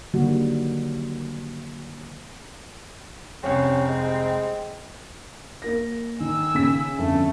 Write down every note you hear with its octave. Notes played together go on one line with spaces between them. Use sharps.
D3 D#3 F#3 G3 A#3 F#4
F1 C2 C4 C#4
G#3
A#3 A#4 A#6
D#3 G#5 E6
C#3 B6
G1 F2 A3